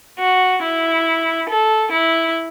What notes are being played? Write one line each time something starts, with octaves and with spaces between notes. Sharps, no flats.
F#4
E4
A4
E4